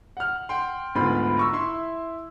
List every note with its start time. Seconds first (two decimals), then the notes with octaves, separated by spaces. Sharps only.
0.17 F#5 F6
0.49 F#5 G5 C6
0.95 D2 G#2 B3 F4 B5 C6
1.37 A#5 C#6 E6
1.53 E4 E5 C6